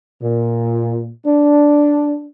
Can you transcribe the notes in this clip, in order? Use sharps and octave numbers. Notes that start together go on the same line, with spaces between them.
A#2
D4